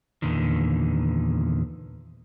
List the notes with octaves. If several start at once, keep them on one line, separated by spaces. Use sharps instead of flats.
E2 A#2 D3 D#3